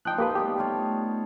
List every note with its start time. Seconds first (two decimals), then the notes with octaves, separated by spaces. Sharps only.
0.05 F3 D#4 F4 G5 F#6
0.18 A#3 F4 G4 B4
0.35 G3 B3 G4
0.58 A3 F4 C#5